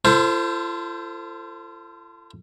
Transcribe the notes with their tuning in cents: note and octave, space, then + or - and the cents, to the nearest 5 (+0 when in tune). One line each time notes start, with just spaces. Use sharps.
F4 -45 A4 +25 C5 +0